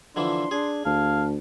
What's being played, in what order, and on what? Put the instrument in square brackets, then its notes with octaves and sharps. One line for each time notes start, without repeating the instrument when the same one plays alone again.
[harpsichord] D3 E3 F3 [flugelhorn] D4 [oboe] C6
[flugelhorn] D4 [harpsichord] G#4
[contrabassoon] D2 [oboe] F5 [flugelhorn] A5